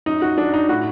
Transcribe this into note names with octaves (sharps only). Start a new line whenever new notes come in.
F#2 D#4
F#4
F#3 D4
D#4
A2 F#4